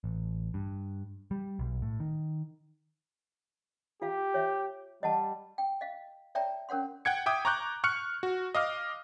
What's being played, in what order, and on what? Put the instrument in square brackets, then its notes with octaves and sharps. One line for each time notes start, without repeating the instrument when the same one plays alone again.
[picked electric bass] A1
G2
G3
B1
A2
D#3
[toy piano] F4 F5 [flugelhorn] G4
[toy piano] C#5 E5
[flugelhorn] G3 [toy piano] D#5 F#5 A5
[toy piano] G5
D#5 F5
C#5 D5 E5 G5 A5 A#5
C#4 A#4 C#5 F#5 C6
[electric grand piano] F#5 G5 G#6 C#7
E5 G5 D6 D#6
A#5 C#6 D6 F#6 G6
C#6 F6 F#6 C#7
F#4
D#5 F5 D6 F6